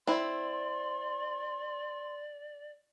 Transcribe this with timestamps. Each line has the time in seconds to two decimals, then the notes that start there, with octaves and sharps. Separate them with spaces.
0.07 C4 E4 D5 C6